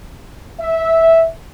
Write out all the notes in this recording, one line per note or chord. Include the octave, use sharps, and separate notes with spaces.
E5